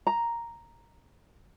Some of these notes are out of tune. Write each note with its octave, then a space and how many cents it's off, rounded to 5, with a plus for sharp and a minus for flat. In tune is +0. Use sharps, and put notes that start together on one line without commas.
A#5 +0